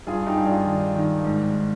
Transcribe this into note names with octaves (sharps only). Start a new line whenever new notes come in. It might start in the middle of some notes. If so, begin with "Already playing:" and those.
G2 F4 G#4
D#4 G4
G2
D4 F4
D#3
D#3
G#2